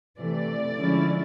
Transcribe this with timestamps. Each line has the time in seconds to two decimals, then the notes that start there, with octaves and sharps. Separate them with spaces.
0.20 C3 E3 A3 D5
0.78 D3 F3 G#3 C#4 E4